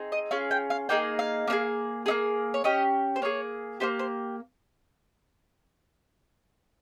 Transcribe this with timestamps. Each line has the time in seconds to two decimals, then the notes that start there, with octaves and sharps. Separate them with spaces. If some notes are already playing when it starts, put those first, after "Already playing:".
Already playing: C4 D#4 G#4
0.12 D#5
0.31 C#4 F4 G#4 F5
0.51 G5
0.70 F5
0.89 A#3 D#4 G#4 G5
1.19 F5
1.47 A#3 D#4
1.52 G#4
2.06 A#3 D#4 G#4
2.54 C#5
2.64 C#4 G4 D#5
3.16 C5
3.22 A#3 D#4 G#4 C#5
3.80 A#3 D#4 G4 C5
3.99 C5